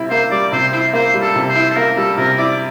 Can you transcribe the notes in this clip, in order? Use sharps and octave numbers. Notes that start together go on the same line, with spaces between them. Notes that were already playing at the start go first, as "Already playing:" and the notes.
Already playing: C3 G3 E4
A#3 C5
G3 D5
C3 C5
E4 C5
A#3 C5
G3
A4
C3
C5
E4
A4
A#3 A#4
G3 A4
C3 A#4
E4 D5